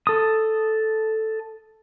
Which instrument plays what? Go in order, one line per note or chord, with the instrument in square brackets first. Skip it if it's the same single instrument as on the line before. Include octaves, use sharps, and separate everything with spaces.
[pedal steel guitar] A4 D#6